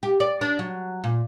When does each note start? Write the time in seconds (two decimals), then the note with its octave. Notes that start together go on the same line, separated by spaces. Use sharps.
0.03 G4
0.20 D5
0.41 D4
0.59 F#3
1.04 A#2